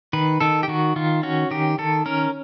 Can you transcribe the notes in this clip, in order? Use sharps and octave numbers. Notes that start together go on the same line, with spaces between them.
D#3 B4
D#3 A4
G4
D#3 F#4
D#3 F4
C#4 F#4
D#3 G4
D#3 A4
C#4 A#4